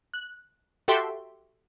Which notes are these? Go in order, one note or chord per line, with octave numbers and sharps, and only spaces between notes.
F#6
F#4 G4 A4 E5 G5 C6